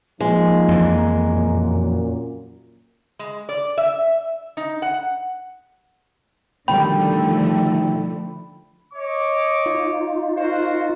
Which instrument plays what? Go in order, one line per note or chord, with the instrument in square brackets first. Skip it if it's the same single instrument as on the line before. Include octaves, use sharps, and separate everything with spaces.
[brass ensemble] F3 D#4 [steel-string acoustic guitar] G#3 [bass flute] A#3
[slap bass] F2 E3
[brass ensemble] F#2 A#2
[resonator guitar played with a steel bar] G#3
D5
E5
D#4
F#5
[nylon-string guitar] B2 D#3 G3 [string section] D3 F3 A3 [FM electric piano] G5 [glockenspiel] B5
[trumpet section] C#5 D#5 D6
[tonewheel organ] D#4 F4
[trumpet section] F#4 A#4 C5